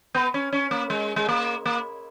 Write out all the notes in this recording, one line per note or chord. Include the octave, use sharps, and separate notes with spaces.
B3
C#4
C#4
A#3
G#3
G#3
A#3
A#3